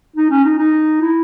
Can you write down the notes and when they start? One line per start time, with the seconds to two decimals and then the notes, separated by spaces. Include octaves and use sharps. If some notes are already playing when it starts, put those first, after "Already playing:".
0.16 D#4
0.30 C#4
0.44 D#4
0.59 D#4
1.02 E4